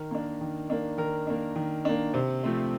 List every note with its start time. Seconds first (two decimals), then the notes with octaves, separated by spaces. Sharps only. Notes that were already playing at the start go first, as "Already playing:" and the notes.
Already playing: D#3 A#4
0.11 A#3 D4
0.41 D#3
0.70 A#3 D4
0.98 D#3 A#4
1.27 A#3 D4
1.56 D#3
1.85 A#3 D4
2.14 C3 C5
2.43 F3 A3 C4